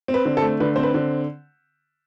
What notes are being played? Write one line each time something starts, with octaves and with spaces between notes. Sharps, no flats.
C4
B4
D3
A4
A3
D3 B4
C4 C5
B4
D3